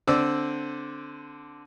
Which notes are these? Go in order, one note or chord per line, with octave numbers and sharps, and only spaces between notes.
D3 C4 D5 D6 E6